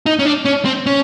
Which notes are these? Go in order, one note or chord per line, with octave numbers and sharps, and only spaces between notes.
D#4
C#4
D4
C#4
C4
C#4